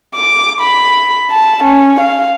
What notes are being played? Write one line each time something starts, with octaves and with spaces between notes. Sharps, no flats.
D6
B5
A5
C#4
F5